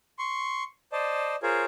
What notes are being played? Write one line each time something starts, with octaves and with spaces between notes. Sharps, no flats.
C6 C#6
C5 D5 D#5 A5
F4 G#4 A#4 C5 C#5